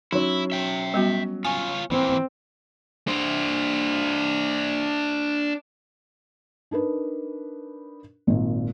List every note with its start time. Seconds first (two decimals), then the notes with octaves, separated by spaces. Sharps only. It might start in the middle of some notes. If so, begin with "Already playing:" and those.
0.12 F#3 C#4 D#4 E4
0.52 E5 G5
0.94 G3 B3 F#4
1.45 F4 C#5 G#5
1.91 E3 A#3 C4
3.08 D4 C5
6.71 D4 D#4 A#4 B4
8.27 G#1 A#2